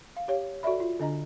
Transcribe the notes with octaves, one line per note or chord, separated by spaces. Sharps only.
F5
G4 C#5 F5
F#4 A4 D5 E5 B5
F4
D3 D4 D#5 A#5